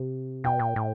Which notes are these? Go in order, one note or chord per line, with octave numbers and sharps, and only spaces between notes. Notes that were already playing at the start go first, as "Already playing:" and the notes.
Already playing: C3
B2 G5
A#2
A2